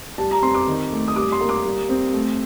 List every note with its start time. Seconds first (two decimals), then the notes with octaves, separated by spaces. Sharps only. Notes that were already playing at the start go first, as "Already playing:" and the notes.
0.18 G3 A5
0.31 A#5
0.42 C4 C6
0.54 D6
0.67 D#3
0.92 A3
1.08 D#6
1.16 G3 D6
1.32 C6
1.41 A#3
1.49 D6
1.64 G3
1.89 C4
2.13 A3